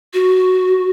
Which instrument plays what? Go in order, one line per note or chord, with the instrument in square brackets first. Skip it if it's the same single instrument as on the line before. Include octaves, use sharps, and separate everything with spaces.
[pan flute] F#4